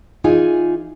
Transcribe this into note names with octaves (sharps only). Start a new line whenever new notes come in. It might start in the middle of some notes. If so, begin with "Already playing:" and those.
E3 D#4 F4 G#4 G#5